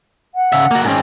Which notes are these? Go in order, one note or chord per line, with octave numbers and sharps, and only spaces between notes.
F#5
C#3 E5
A#3 F#4
G#2 C4 C#4